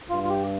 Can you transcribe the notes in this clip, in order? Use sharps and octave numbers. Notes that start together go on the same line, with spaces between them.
G2 F4
F4
G4